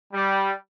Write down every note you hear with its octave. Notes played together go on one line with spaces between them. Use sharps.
G3